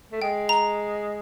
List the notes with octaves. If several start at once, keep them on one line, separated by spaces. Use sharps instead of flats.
A3
G#3 G5
A#5